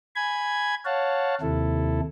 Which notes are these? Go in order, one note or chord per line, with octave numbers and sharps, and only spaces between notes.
G#5 B5 G#6
C#5 F5 F#5 A5
D#2 C3 E4 A4